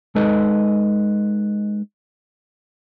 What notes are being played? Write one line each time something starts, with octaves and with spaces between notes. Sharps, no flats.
G#3 D#4 A4 B4 D#5